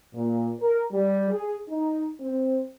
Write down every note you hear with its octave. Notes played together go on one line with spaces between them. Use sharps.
A#2
A#4
G3
G#4
D#4
C4